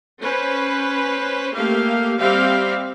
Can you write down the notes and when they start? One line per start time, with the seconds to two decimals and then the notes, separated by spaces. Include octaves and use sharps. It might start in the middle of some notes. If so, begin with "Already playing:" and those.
0.22 C#4 B4 C5
1.55 A3 A#3 G4 F5
2.18 G3 C4 G4 E5 F5